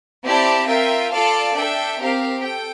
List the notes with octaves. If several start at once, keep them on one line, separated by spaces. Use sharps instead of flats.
C4 E4 G4 D5 A5
F4 A#4 E5 G5
F4 A4 D5 F5 A5
D4 A4 E5 G5
C4 G4 A#4 F5
A4 G5